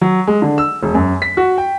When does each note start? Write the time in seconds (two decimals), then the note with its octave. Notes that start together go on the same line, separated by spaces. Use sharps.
0.01 F#3
0.27 G#3
0.42 D3
0.58 E6
0.83 E1
0.95 F#2
1.22 B6
1.37 F#4
1.58 G5